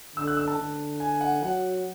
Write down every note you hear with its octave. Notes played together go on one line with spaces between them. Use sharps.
D3 E6
F#6
E6
A5
D3
G#5
F#5
F#3 F#5